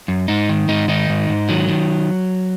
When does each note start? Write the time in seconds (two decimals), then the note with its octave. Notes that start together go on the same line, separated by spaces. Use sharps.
0.08 F#2
0.28 G#2 D#4
0.49 D#3
0.68 G#2 D#4
0.88 D#3 D#4
1.09 G#2
1.29 G#2
1.49 D#3 F#3
1.69 D#3